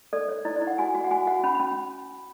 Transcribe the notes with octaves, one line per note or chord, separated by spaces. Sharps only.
A4 D5
C#5
E4 D5
D5
E4
F#5
F#4 G#5
F#4
F#5
F#4 G#5
F#4 F#5
C#4 B5
B5
C#4